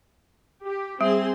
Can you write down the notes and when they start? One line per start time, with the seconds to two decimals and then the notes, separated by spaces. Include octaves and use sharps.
0.65 G4
1.01 G3 C4 G#4 C6